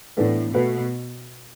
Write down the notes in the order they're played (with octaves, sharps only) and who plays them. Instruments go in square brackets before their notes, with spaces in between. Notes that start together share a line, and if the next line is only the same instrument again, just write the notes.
[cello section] A2 [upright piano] E3 B3 D4 A4
[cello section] B2 [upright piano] A3 F#4 B4